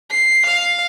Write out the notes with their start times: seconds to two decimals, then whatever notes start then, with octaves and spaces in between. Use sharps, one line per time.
0.10 C7
0.46 F5